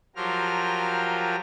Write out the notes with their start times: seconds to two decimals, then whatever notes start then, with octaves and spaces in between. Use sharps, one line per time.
0.16 F3 F#3 F4 G4 A#4 F6